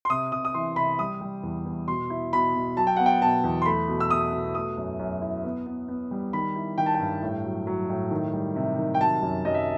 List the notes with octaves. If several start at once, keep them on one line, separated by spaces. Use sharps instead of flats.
C6
C3 D#6
C3 D#6
D#6
E3 C6
C3 B5
G3 D#6
G3
E2
E2
B2 C6
E4
B2 B5
B2
F#3 A5
G5
B3 F#5
G5
B2 A5
E2
C6
A3 B5
B2
E6
B2 D#6
B2
A3 D#6
F#2
F#2
E4
B3
B3
B3
G3
D#3 B5
E4
D#3 G5
A5
G5
G2
A2
F#3
F#3
A2
D#3
G3
C3
D#3
G5
F#3 A5
F#2
F#2 D#5
E5